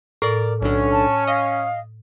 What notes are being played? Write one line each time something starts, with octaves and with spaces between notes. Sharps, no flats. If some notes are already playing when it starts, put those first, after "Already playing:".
A2 A#4 D5
B1 D3 C#4
A5
D#5 F5